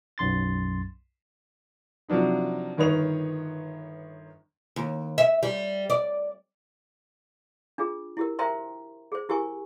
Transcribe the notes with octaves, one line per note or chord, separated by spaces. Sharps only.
B1 F#2 C6 A6
C3 F3 F#3 D4 D#4
G1 D#3 B4 C#5 D#5 F7
D#2
E5
G3
D5
D4 F4 G#4
E4 G4 A#4
A#4 C5 E5 G5 A#5 C6
G#4 C5
E4 G4 A#4 G#5 C#6